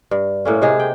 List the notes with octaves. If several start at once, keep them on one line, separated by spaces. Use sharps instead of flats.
G2
A2 A#3 C#4
C3 G#3 D#4 G#4
G5